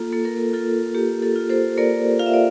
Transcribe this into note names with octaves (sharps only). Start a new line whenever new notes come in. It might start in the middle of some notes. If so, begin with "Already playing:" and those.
Already playing: A#3 F4 A4
A#3 A4
A#4
A4
F4 A4
A#3 G4
A4
F4
A4 C5
A#3 A#4 D5
F4 F5
E5
D5